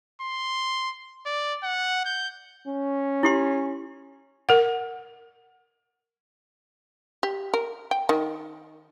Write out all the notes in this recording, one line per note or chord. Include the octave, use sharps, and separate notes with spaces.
C6
D5
F#5
G6
C#4
E4 G4 C6
A#4 F#5
G4
A#4
G5
D#3